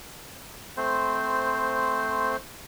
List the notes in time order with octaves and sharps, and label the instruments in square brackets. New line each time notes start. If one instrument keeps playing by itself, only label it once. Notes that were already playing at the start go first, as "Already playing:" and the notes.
[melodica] A3 C4 C5